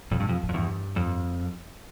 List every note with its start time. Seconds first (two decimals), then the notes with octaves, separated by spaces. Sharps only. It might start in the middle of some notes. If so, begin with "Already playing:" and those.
0.11 F2 B2
0.20 G2
0.29 F2
0.43 A2
0.49 F2
0.54 E2 G2
0.96 F2